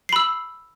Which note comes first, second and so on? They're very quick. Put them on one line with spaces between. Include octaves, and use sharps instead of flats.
C7 B5 E6